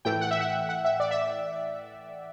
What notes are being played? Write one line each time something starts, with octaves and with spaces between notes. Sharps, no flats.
A2 E3 A3 G5
F#5
E5
F#5
F#5
E5
D5
E5